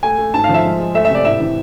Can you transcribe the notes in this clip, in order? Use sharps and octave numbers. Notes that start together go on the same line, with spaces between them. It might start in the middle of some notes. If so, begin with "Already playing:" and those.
A3 G#5
A3
G#2 A5
F5
F3
E5
G#3
G#3
A3 E5
E5
C3 D5
A2 E5
E3